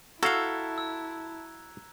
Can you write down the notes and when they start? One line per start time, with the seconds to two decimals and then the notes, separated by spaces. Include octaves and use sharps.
0.23 E4 F#4 A4 E5 F5 A#5 F#6 G#6
0.78 E6